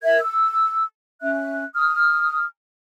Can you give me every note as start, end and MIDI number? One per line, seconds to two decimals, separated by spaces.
0.03 0.19 70
0.03 0.19 76
0.03 0.19 92
0.20 0.83 88
1.22 1.64 61
1.22 1.64 76
1.22 1.64 90
1.74 2.43 87
1.74 2.43 89